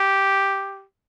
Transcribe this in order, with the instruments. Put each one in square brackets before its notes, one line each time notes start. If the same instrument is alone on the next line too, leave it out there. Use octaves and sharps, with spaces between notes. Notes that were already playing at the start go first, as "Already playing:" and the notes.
Already playing: [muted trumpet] G4